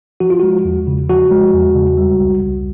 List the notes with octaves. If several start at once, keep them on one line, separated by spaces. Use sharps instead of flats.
F3 F#4
F4
G#3 F#4
E2
C#3
F3 F#4
G#3
E2
C#3
G3
C2
C2